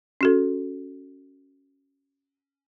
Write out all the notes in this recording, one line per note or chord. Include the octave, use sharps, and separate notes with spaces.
C#4 F#4 A4